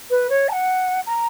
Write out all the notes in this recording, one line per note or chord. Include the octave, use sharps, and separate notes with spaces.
B4
C#5
A#5
F#5
A#5